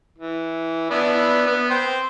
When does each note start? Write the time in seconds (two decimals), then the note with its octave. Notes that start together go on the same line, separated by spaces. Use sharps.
0.18 E3
0.91 B3 D4 E4
1.47 B3
1.70 C5 G5